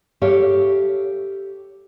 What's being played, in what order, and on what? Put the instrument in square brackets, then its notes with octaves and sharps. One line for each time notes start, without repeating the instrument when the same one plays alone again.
[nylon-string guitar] G4 A4 C#5 E5 F5